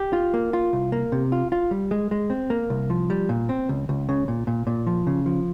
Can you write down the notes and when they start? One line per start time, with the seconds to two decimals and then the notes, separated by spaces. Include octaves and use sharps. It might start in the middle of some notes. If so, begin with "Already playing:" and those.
Already playing: G4
0.13 F4
0.34 A#3
0.53 F4
0.73 C2
0.92 A#3
1.12 C3
1.32 F4
1.52 F4
1.71 G3
1.91 G#3
2.11 G#3
2.30 C4
2.50 A#3
2.70 C2
2.90 F3
3.10 G3
3.29 A#2
3.49 C4
3.69 C#2
3.89 C#2
4.09 C#3
4.28 A#2
4.47 A#2
4.67 A#2
4.87 F3
5.07 C#3
5.26 F3